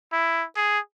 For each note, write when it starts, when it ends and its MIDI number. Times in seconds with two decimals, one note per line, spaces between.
0.12 0.45 64
0.56 0.79 68